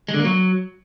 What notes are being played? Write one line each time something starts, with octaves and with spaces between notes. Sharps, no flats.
G#3
D3
A#3
F#3